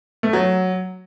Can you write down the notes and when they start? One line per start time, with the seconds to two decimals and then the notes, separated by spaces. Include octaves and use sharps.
0.23 A3
0.33 F#3